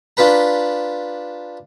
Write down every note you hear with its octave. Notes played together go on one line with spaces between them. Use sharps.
D4 F4 G4 B4 A#5